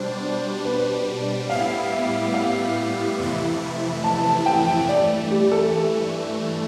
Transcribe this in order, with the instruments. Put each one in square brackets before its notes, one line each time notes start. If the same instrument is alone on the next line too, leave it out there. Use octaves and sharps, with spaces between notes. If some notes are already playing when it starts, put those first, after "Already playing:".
Already playing: [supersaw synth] B2 G3 D4 [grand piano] C5
[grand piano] B4
[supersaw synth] A2 G3 B3 E4 G4 [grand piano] F5
[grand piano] E5
F5
[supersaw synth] F2 C3 E3 A3 E4
[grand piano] A5
G5
[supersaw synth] G2 E3 A3 [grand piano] D5
[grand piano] G4
A4